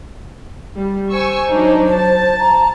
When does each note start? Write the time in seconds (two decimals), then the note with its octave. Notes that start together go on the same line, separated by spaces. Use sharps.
0.77 G3
1.12 C5 G#5 C#6 E6
1.48 F#3 D4 D#4
1.92 A5
2.39 A#5